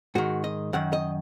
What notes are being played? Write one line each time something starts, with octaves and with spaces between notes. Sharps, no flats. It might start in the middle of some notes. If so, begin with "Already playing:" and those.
G#2 D#3 F#4
D#5
F#2 D#3 F#5
D#5